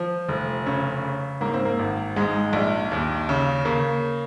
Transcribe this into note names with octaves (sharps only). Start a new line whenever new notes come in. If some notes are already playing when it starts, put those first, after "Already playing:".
Already playing: F3
F1
C#3 C#4
C#3
G#2 A#3
C4
A#3
G#1
G#2 G#3
A#1
D#2
C#3
C#3 A#3